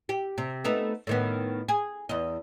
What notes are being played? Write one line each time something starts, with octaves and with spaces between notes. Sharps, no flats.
G4
C3
A3 B3 D#4
A2 D#3 B3
G#4
E2 D#5